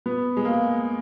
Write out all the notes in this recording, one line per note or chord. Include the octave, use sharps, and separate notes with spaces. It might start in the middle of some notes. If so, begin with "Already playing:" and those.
B3
G#3
A#3